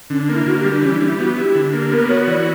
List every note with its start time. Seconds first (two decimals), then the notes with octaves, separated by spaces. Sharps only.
0.10 D3 C#4
0.22 D4
0.29 A#3
0.34 E4
0.46 D3 F#4
0.59 G4
0.64 G3
0.72 D4
0.82 E3 C#4
0.94 D4
1.01 G3
1.07 E4
1.19 B3 F#4
1.37 E4 G4
1.55 D3
1.73 A#3
1.92 B3 A#4
2.09 F#4 C#5
2.28 E3 D5